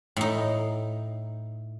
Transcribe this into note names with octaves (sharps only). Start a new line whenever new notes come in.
A2 D#4